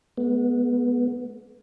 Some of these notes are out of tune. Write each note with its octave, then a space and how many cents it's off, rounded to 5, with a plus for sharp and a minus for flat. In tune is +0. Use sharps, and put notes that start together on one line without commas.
G#3 +35 B3 -15